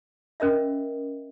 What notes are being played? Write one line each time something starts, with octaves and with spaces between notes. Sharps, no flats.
C#4 A#4 D#5 E5